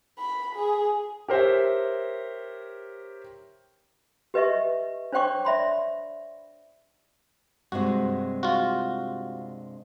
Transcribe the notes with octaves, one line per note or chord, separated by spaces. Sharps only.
B5
G#4
G4 A#4 C5 C#5 E5
G4 B4 D#5 E5 C#6
D4 C5 C#5 G5 C#6 D6
D5 E5 B5 C6
G2 C3 G#3 F#4
F4 F#4